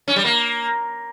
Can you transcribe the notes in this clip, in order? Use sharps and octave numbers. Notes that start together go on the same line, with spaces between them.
C#4
G3
A#3